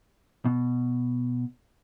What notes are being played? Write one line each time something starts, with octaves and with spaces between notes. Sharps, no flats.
B2